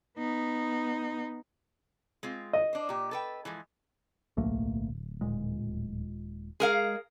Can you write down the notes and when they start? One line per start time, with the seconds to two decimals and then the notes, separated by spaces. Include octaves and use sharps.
0.18 B3 D#4
2.23 G#3 C4 F4
2.53 D#5
2.73 D4 C5
2.89 A#2 G4
3.11 A4 B4 G5
3.45 E3 F3 G#3
4.37 D1 B1 A3 A#3
5.21 D#1 A#2 G#3
6.60 G#3 G#4 A#4 F5